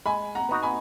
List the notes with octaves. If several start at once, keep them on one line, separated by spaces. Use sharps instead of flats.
G#3 G#5 B5
F#5 A#5
B3 D#4 F#4
G#5 B5